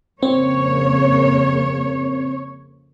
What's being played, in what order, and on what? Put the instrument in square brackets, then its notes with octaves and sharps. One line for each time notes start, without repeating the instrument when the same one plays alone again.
[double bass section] F2 C#3 A#3 [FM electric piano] C4 [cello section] C#5